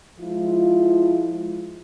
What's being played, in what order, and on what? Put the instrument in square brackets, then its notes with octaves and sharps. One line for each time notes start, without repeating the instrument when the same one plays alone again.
[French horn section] F3 G#3 E4 F4